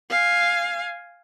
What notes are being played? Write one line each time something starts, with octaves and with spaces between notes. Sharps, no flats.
F5 G#5